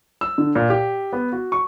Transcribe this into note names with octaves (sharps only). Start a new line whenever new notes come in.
E6
D3
A#2
G4
B3
F#4
C#6